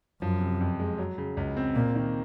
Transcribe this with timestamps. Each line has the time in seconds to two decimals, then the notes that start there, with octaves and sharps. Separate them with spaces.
0.22 F#2 F3
0.41 C3
0.61 F2
0.80 G#3
0.98 F#3
1.18 C#3
1.37 C#2
1.57 C4
1.76 A#2 A#3
1.95 D#3